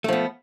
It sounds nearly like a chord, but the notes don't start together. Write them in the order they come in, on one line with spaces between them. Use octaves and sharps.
A3 F3 B3